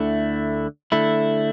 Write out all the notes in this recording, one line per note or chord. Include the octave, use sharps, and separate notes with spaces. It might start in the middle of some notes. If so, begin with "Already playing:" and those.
Already playing: D2 D3 A3 E4
D3 A3 E4